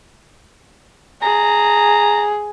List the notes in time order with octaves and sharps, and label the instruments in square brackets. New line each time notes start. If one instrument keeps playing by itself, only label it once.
[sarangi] G#4 [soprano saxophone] A#5